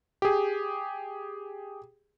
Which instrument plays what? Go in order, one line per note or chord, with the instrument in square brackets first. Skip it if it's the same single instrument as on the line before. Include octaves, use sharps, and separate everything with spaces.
[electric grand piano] G4 G#4